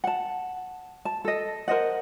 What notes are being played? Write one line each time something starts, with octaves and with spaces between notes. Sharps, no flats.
F#5 A5
A5
A4 D#5
A#4 C5 D#5 F#5